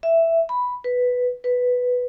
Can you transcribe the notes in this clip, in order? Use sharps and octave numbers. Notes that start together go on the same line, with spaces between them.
E5
B5
B4
B4